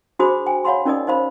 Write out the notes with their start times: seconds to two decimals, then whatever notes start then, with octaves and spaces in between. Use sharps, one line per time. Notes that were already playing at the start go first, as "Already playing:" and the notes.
0.19 D4 F#4 G#4 C5 B5 D#6
0.46 G5 G#5
0.64 C#5 F5 F#5 B5 C6
0.85 C#4 D#4 A#4 D5 D#5 D#6
1.07 D#4 C5 F5 B5